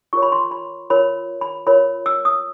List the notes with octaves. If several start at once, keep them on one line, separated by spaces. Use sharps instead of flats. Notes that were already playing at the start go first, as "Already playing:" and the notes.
F4 A#4 C#5 C#6
B5
C6
B5
F4 A#4 C#5 B5
B5
F4 A#4 C#5 B5
E6
D#6